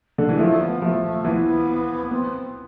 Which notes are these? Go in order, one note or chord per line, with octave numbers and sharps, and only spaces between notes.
D3
E3 G#3
F3 A3
B3
F3 A3
A3
E3 B3
B3 C4